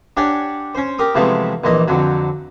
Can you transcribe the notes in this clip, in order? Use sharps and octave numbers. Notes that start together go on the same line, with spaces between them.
D4 G4 C#5 D5 F#5 G#5
C#4 C5
G4 A#4 D6 D#6
C3 E3 F3 G#3 A3 B3
A#1 A#2 E3 D#5
F2 D3 F#3